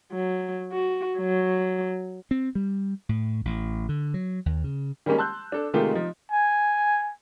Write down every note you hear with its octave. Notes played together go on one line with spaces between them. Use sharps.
F#3
F#4
F#3
C4
G3
A2
A1
D3
F#3
D#2
C#3
D#3 G3 G#3 A#3 C#4
A5 C6 E6 F#6 G6
D4 A4
C3 D#3 G#3 A3 F4 G4
F3 D#4
G#5